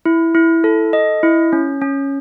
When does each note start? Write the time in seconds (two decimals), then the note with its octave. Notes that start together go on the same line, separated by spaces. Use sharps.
0.05 E4
0.35 E4
0.64 A4
0.93 D#5
1.23 E4
1.53 C#4
1.82 C#4